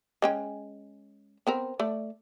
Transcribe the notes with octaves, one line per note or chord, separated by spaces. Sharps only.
G#3 C#4 G5
B3 C4 A#4
A3 D5